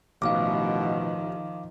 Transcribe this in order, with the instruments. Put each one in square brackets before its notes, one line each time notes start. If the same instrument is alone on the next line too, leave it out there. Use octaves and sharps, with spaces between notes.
[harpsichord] A1 [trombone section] B2 [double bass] D#3 F3 [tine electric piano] F5 D6